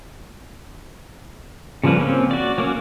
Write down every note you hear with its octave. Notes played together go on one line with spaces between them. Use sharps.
C#3 F3 G3 A#3 B4
A#3 C4 C#4
F#4 D5
F#3 A#3 C#4